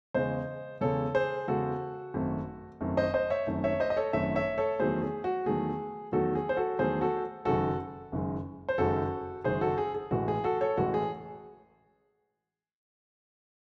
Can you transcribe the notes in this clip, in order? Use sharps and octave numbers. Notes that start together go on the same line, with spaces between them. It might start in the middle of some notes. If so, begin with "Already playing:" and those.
E2 C#3 G#3 C5 D#5
E2 C#3 G#3 A4 C#5
G#4 C5
E2 C#3 G#3 F#4 A4
G#1 F#2 D#3 A3
G#1 F#2 D#3 A3
C5 D#5
C5 D#5
C#5 E5
G#1 F#2 D#3 A3
C#5 E5
C5 D#5
D#5
A4 C#5
G#1 F#2 D#3 A3 C#5 E5
C#5 E5
A4 C#5
E2 D#3 F#3 A3 G#4 C5
G#4
F#4
E2 D#3 F#3 A3 G#4
E2 D#3 F#3 A3 F#4 A4
G#4
C5
F#4 A4
E2 D#3 F#3 A3 G#4 C5
F#4 A4
F#1 F#2 D#3 G#3 F#4 A4
F#1 F#2 D#3 G#3
C5
F#1 F#2 D#3 G#3 F#4 A4
F#1 F#2 D#3 G#3 G#4 C5
F#4 A4
G#4
G#4
A1 A2 E3 G#3 F#4
G#4
F#4 A4
A4 C#5
A1 A2 E3 G#3 F#4
G#4